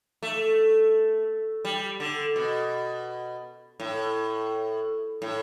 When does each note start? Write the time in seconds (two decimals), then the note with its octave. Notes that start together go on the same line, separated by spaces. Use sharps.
0.23 A3
1.65 G3
2.00 D3
2.36 B2
3.80 A2
5.22 A2